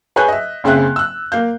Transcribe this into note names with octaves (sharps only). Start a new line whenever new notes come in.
G#4 B4 C#5 G#5 F#6 G6
D#5 E5
F#1 C#3 C4 G#4 E5 F#6
E6 F#6
A#3 F5 G6